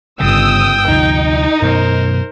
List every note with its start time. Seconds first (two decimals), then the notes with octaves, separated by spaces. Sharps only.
0.20 G1 C#3 G5 D#6 E6
0.88 D2 C3 F3 D#4
1.62 F#2 B2 B3 A#4 C5